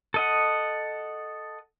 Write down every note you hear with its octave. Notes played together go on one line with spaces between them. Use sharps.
A4 D#5 F#5